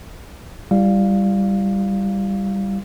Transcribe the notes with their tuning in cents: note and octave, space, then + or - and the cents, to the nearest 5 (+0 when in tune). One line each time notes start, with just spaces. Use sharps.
G3 +0 E4 +35 F5 +0